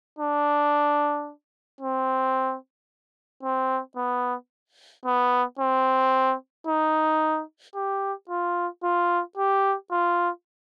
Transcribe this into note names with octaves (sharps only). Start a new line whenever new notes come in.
D4
C4
C4
B3
B3
C4
D#4
G4
F4
F4
G4
F4